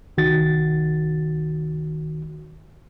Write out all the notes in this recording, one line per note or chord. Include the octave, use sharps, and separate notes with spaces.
C2 D#3 F#4 A6